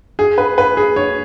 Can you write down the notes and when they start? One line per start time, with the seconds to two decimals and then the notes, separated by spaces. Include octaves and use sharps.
0.19 G#4
0.38 B4
0.58 B4
0.77 G#4
0.96 C#5